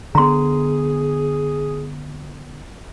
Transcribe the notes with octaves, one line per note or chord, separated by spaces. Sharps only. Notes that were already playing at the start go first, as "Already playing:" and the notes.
D3 B3 G#4 A#5 C6